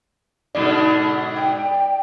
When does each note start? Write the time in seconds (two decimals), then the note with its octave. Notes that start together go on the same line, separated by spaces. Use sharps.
0.55 G#2 B2 D3 D5
1.37 G5